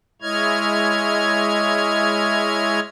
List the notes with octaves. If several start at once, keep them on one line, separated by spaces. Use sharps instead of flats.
G#3 E4 C#5 D#5 F6 G#6